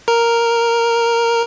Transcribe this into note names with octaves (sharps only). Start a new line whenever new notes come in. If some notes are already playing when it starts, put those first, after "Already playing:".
A#4